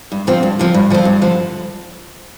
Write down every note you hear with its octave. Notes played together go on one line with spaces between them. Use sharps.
G2
D3 F3 C4 F4
G2
D3 F3 C4 F4
G2
D3 F3 C4 F4
G2
D3 F3